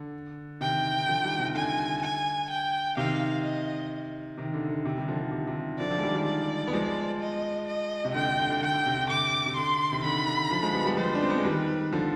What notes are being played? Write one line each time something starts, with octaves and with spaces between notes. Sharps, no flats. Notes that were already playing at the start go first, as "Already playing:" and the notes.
Already playing: D3
C3 D#3 G5
D#3
D3 F3
D#3 G3
C3
D3 G#5
G#5
G5
C3 D#3 F5
D#5
C3 D#3
D3
D3
C3 D#3
D#3 G3
D3 F3
D3
C3
C3 D#3
D3 F3 D5
D3 F3
G#3
D#3 G3
D#3 G3
D5
B3
F3 G#3
D#5
D#5
C3
D3 G5
D3
D3
D3
D3 G5
D3
C3
D3
D3 D6
C3
D3 C6
C3 D#3
D3 B5
D3
D3 F3
F3 G#3
G3 B3
G3 B3
F3 G#3 C5
D4
C4
B3
G#3
D#3 G3 B4
D3 F3